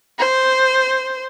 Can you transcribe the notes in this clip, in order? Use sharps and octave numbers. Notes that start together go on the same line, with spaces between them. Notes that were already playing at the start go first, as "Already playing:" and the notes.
C5